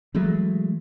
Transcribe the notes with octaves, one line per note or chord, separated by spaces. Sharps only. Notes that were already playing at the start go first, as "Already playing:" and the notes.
E3 F#3 G#3 A3